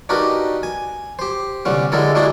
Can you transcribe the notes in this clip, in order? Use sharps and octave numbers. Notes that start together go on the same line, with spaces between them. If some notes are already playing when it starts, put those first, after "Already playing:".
D4 D#4 F#4 G4 A#4 B4
G#5
G4 C5
C2 D3 G3 C#4 F#5
D3 G3 G#3 E4 A4 A#4
G3 G#3 D4 E4 F#4 G#4